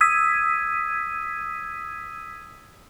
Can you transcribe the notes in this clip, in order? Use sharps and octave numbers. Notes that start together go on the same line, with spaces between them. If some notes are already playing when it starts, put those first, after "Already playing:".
D#6 E6 G#6 B6 D#7